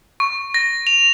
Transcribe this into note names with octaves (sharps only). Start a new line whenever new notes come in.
C#6
A#6
F7